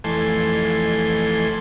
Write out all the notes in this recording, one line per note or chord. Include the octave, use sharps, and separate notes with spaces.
F2 E3 A3 A4 G#5 C6